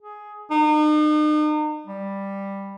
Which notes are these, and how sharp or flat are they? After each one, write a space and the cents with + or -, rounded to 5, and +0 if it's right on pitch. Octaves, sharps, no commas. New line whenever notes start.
G#4 +10
D#4 -40
G3 +5